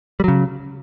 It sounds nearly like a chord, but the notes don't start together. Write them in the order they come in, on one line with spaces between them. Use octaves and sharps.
G3 F#3 C#3